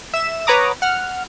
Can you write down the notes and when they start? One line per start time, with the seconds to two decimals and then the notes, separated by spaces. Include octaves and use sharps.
0.14 E5 E7
0.47 B4 C#5 F#5 A#5 D6 D#6
0.82 F#5 F6